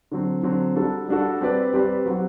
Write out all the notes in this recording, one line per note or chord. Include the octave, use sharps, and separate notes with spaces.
D3 F#3 C4
D3 F#3 C4
G3 D4 F#4 A4
G3 D4 F#4 A4
G3 C4 G4 B4 D5
G3 C4 G4 B4 D5
F#3 C4 F#4